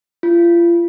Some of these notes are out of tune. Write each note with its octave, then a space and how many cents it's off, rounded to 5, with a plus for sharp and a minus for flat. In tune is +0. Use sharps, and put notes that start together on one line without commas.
F4 -35